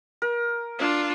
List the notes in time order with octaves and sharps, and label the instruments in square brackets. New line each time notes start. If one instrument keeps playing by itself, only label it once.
[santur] A#4
[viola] D4 F4